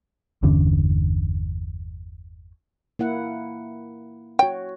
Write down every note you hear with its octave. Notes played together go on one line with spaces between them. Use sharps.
G1 E2 D3 C#4
A#3 E4 F#5
F#4 C#5 G5